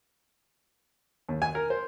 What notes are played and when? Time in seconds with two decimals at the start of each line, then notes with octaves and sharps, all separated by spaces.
1.29 D#2
1.42 G#5
1.55 A#4
1.70 C5